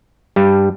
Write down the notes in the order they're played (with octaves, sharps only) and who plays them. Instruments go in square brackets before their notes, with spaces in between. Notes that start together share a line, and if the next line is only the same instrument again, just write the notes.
[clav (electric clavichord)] G2 G3